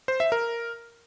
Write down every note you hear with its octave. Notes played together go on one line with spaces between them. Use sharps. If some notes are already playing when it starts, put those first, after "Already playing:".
C5
E5
A#4